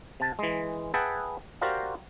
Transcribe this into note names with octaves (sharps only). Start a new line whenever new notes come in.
C3 A5
E3 G#3
G#4 B4 E5 F#5 G5 A5
F#4 G4 A#4 C5 D5 F5